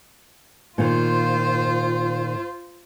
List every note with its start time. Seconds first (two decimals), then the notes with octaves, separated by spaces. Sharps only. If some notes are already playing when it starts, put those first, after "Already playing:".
0.78 A#2 D#3 F4 C5